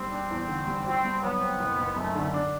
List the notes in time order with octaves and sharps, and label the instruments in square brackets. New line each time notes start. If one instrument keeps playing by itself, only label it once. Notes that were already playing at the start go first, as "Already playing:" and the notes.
Already playing: [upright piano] G3 [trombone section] C4
[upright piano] D4
E2
D3
G3
[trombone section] C4 [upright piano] F#4
[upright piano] G2
[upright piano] F#3 [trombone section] B3
[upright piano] C4
F#1
F#1
[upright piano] F#2 [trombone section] A3
[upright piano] D3
D4